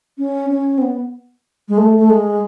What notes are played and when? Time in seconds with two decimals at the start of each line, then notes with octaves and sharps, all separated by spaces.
0.18 C#4
0.50 C#4
0.78 C4
0.82 B3
1.68 G#3
1.78 A3
1.97 A3
2.10 G#3